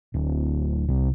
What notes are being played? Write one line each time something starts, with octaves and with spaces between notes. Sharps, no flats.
D1
C2